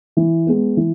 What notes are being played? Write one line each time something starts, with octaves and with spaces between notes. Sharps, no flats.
E3
G#3 B3
E3